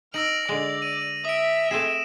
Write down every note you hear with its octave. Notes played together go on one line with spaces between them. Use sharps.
D#4 E6 F6 A#6 D7 F#7
D3 G#3 D5
D#7
E5 D#6 D7
A3 C4 G#4 E7